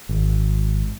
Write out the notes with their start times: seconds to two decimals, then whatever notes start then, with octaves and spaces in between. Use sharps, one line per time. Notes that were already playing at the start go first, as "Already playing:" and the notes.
0.09 G#1